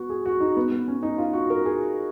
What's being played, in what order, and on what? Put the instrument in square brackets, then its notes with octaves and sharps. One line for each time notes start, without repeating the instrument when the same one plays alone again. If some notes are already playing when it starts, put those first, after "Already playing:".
Already playing: [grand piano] B3 F#4
G#4
F#4
D#4
B3
B3
C#4
D#4
F4
F#4
A#4
G#4